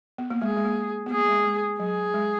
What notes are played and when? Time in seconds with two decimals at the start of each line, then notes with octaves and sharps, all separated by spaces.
0.18 B3
0.30 A#3
0.42 G#3 G#4
0.57 G#3
0.65 A#3
1.06 B3
1.11 A#3 G#4
1.29 G#3
1.45 G#3
1.79 F#3 G#4
2.14 G#3